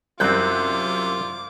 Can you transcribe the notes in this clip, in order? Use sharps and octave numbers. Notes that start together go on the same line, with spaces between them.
C2 F#2 C4 F4 D6 F#6 G6